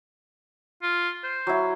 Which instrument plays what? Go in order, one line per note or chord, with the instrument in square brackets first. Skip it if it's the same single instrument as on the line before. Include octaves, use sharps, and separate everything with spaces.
[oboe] F4
C5
[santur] F#3 E4